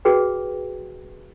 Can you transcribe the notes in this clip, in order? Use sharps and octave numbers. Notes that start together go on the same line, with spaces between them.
F#4 G#4 B4 G5